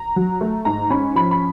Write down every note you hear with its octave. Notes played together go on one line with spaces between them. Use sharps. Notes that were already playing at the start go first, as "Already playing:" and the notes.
Already playing: A#5
F#3
A3
G#2 A#5
C#4 B5
F3 B5
B5